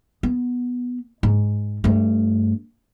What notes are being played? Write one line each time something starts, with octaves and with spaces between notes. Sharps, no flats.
B3
G#2
G2 A3